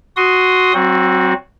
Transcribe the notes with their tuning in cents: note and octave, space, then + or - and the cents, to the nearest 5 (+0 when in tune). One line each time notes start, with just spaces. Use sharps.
F#4 +0 C6 +0 D#6 +10
F#3 +30 C4 +10 F#4 -15